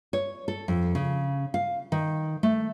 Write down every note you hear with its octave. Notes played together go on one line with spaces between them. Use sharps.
C#5
A4
F2
C#3
F5
D#3
A3